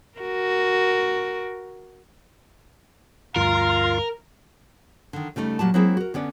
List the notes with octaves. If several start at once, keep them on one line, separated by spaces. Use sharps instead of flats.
F#4 A#4
D2 G2 F4 A#4 F5
D3 D#3
C#3 G3 A3 D#4
A#2 F#3 G3 A5
F#3 G#3 A#3 C4 E4 G#4
F#4 A#4
D3 B3 C#4 D5